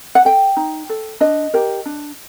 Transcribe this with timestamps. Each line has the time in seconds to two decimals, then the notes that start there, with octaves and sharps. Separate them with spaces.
0.15 F#5
0.25 A4 G5
0.57 D#4
0.89 A4
1.20 D4 D#5
1.54 G4 A#4
1.86 D4